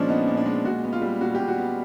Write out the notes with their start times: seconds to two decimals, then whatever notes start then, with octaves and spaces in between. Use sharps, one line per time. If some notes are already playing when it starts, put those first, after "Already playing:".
Already playing: A#2 F3 G#3 C#4 D4
0.09 B3 D#4
0.27 A#2
0.37 D4
0.46 G#3
0.65 A#2 F#4
0.84 B3
0.93 F4
1.02 G3
1.21 A#2 F#4
1.35 G4
1.40 A#2
1.48 F#4
1.58 B3